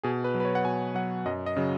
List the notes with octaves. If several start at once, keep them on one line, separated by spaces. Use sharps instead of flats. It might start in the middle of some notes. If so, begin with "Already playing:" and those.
B2 G#4
B4
F#3
B4
C#5
F#5
B2 G#5
F#3 F#5
F#2 D#5
D#5
C#3 F#3